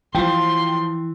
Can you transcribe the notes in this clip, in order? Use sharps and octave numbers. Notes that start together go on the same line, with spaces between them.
E3 F3 G5 C6